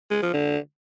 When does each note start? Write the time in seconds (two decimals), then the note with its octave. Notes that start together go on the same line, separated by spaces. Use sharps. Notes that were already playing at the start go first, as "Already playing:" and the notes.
0.10 G#3
0.22 F3
0.34 D3